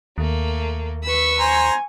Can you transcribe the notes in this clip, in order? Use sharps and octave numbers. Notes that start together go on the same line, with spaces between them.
D#2 A3 A#3
B4 B5 C#6 E6
C5 G#5 A#5